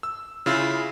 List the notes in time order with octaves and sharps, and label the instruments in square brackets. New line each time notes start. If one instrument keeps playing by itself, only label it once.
[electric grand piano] E6
C#3 E4 F4 E6